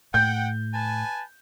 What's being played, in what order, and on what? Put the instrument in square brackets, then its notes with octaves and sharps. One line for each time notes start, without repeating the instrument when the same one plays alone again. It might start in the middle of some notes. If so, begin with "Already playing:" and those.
[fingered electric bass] A2 [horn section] F#5 G5 [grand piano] G6
[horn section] B4 G#5 A5